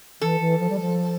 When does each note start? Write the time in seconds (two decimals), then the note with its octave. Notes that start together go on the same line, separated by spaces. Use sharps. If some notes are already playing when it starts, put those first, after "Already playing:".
0.21 E3 A4
0.40 E3
0.59 F3
0.69 G3
0.80 F3